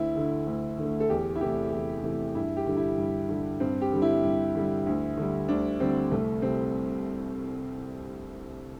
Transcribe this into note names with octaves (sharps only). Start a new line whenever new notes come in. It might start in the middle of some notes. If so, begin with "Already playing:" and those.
Already playing: D2 E4
D3 A3
D2
D3 A3
A4
E2 G4
E4
C3 E3 A3 G4
E2
C3 E3 A3
G2 E4
G4
D3 G3
E4
G2
D3 G3
G2 C4
G4
D3 G3
E4
G2
D3 G3
D2
D3 G3
D2 D4
D3 G3 C4
C2 A3
C3 G3 C4